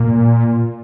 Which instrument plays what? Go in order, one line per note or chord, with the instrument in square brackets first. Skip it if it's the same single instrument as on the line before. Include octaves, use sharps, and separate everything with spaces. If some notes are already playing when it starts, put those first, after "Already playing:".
Already playing: [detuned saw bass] A#2